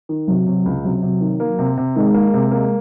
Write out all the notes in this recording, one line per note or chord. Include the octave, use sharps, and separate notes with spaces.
D#3
C3 F#3
C3
C#2
C3 F#3
C3
D#3
A#3
C3
C3
D#3 G#3
A#3
C3
A#3